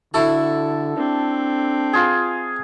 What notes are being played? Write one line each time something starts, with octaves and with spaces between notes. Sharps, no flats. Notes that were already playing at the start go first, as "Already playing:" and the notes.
D3 E4 F#4 A4
C4 D4
F4 G#4